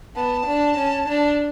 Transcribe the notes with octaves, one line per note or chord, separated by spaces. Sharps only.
B3 A5
D4
C#4
D4